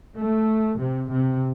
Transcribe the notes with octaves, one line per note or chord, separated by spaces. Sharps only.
A3
C3
C3